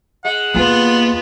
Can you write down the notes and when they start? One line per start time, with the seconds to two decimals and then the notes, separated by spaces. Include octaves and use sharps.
0.25 G#3 F#5
0.54 D#2 A#3 B3 F4